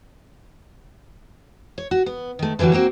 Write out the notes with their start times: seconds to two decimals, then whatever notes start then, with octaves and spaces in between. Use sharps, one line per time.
1.78 C#5
1.91 F#4
2.06 B3
2.39 D#3 A3
2.59 D3 E3 F#3 G3 F#4
2.73 A#3 C4 F#4